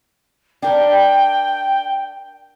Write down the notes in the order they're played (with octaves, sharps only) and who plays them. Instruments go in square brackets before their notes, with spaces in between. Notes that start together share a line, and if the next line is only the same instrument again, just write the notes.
[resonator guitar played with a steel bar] D4 A#4 [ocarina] G5